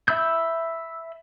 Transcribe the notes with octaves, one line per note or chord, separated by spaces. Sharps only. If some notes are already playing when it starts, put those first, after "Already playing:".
E5 B5 E6 G6